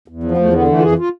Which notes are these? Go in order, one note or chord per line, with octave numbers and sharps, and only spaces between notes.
E2
F3
B3
E2 A3
D3 B3
E3 A3
F4
F2 G#4
F4